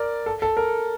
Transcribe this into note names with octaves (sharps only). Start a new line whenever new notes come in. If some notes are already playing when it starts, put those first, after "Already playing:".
Already playing: A#4 D5
A4
A4
A#4